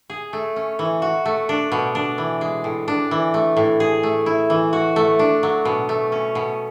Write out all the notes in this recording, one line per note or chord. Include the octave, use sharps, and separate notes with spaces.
G#4
A3
C#4
E3
F#4
A3
D4
B2
D4
E3
G#3
A2
D4
E3
A3
A2
G#4
A3
E4
E3
F#4
A3
D4
F#3
B2
A3
C#4
B2